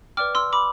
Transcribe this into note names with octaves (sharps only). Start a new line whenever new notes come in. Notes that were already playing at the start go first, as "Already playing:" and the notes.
B4 D5 G5 D6 F6
C6 E6
B5 D6